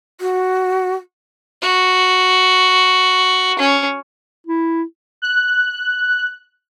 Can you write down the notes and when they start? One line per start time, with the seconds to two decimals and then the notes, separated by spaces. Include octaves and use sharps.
0.21 F#4
1.62 F#4
3.59 C#4
4.47 E4
5.22 F#6